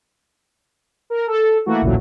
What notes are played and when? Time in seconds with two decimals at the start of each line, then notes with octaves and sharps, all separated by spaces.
1.10 A#4
1.27 A4
1.66 E3 A3 A#3 F#4
1.82 A1 D2 A#2 E3 F#3